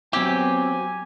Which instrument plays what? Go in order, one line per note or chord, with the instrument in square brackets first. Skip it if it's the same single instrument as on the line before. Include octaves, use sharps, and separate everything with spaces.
[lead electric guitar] F#3 C4 [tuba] B3 [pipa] G4 [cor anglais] G#5